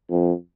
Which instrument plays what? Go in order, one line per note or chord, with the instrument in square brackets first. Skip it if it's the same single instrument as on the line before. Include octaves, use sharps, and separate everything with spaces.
[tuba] F2